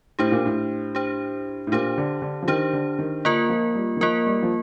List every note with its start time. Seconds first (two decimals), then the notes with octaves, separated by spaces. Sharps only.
0.19 A2 D4 G4 C5
0.32 A#2
0.46 A2
0.95 D4 G4 C5
1.67 A2
1.72 A#2 D4 G4 C5
1.98 D3
2.22 D3
2.42 F3
2.48 D#3 D4 G4 C5
2.73 D3
2.99 D#3
3.25 D3 A#3 F4 A#4
3.50 F3
3.75 G3
3.97 D#3
4.01 F3 A#3 F4 A#4
4.27 G3
4.43 F3